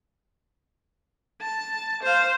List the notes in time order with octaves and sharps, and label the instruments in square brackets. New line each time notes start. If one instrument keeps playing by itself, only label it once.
[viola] A5
C5 F5